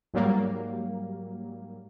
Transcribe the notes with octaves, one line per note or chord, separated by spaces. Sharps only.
G#2 F#3 G3 A#3